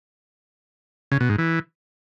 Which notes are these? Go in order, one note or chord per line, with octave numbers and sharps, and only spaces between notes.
C#3
B2
G#2
E3